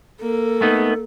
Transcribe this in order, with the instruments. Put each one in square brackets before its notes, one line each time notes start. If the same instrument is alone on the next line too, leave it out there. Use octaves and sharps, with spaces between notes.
[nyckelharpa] A#3 [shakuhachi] A4
[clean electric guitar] A3 B3 D#4